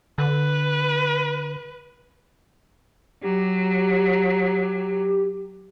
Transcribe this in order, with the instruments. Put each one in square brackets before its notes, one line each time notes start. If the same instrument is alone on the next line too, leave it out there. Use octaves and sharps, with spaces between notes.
[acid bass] D3 [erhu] B4
[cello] F#3 [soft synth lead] G4